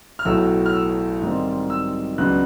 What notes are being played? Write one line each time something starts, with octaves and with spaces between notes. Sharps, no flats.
F6
B1 A2 F#3 A3 E6
F6
E6
G#2 D#3 G3 C4
E6
C#2 C#3 F#3 B3 D4 F#6